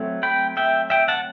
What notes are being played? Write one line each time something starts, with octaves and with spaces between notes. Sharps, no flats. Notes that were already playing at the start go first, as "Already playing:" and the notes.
Already playing: F#3 A3 C4
G5 B5
E5 G5
E5 G5
F#5 A5